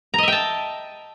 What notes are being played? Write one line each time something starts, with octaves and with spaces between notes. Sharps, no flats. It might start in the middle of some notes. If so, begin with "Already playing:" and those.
D#5 E5 G5 A5 A#5